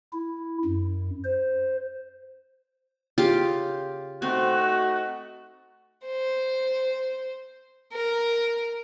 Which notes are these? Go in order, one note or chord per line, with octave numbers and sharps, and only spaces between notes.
E4
F#2
C5
C#3 F4 G4
A3 C4 D#4 F#4
C5
A#4